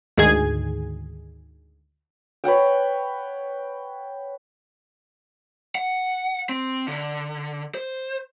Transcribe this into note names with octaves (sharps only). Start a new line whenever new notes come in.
D2 G#2 D#3 G#4 G#5 G#6
B4 C#5 F#5 G5
F#5
C4
D3
C5